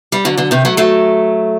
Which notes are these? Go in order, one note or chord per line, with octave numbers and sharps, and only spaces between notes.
G3
D3 F#3
D3 F#3
C3 D#3
F#3 A3
F#3 A3